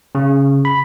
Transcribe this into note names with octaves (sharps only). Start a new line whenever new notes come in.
C#3
B5